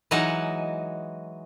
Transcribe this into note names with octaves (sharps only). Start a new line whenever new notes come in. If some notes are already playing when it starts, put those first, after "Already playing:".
E3 F#3 G#3 D#4 F#4 D#5